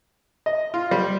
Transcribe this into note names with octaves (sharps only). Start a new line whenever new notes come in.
D#5
F4
G3